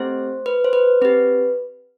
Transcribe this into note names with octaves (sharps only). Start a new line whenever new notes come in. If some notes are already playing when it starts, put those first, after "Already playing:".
Already playing: A3 C4 G4 C5
B4
C5
B4
C4 G4 B4